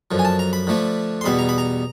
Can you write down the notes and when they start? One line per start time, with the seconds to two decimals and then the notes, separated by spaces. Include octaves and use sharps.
0.11 F#2 D3 F3
0.19 G#5
0.25 A5
0.39 A#5
0.53 B5
0.67 D3 F3 A3 D4
1.21 C6
1.24 E2 B2 G3 B3 B5
1.39 A#5
1.49 B5
1.58 A#5